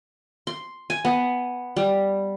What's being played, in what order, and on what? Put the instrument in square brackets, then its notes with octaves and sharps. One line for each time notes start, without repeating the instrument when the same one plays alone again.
[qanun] C6
G#5
B3
G3